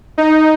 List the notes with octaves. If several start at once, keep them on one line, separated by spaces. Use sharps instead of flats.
D#4